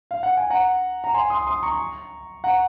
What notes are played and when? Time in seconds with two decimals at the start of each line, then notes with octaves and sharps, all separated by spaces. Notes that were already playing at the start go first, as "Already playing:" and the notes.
0.11 F5
0.23 F#5
0.37 G#5
0.50 F#5 A#5
1.04 A#5
1.14 G#5 C6
1.30 C6 D#6
1.47 C6 D#6
1.63 A#5 C#6
2.44 F#5 A#5